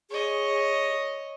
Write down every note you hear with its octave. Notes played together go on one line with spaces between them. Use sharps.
G#4 C#5 D#5